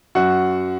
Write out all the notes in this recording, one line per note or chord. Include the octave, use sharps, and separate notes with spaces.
F#2 F#4 F#5